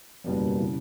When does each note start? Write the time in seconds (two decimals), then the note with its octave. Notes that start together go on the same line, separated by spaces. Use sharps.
0.24 F#1 E2 B2 G3 A#3
0.58 C#3 E3